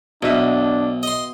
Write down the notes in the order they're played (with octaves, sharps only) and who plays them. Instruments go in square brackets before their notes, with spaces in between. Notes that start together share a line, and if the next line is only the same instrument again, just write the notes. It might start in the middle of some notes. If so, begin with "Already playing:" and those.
[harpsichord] B1 [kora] B2 D#5 E5 [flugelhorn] D4
[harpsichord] D#5 C6